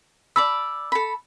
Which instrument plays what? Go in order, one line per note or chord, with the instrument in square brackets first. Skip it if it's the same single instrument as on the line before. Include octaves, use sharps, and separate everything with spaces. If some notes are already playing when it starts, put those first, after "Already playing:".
[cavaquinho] D5 A5 B5 [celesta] E6
[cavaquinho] A4 B5